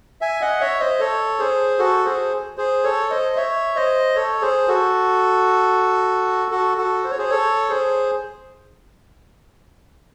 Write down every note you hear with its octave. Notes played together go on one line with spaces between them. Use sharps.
E5 G#5
D#5 F#5
C#5 E5
C5 D#5
A4 C#5
G#4 C5
F#4 A4
G#4 C5
G#4 C5
A4 C#5
C5 D#5
C#5 E5
C5 D#5
A4 C#5
G#4 C5
F#4 A4
F#4 A4
F#4 A4
C5
C#5
G#4 C5
A4 C#5
G#4 C5